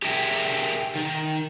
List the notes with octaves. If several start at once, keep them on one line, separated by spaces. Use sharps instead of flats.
G4 G#4 A#4 E5 G5
D#3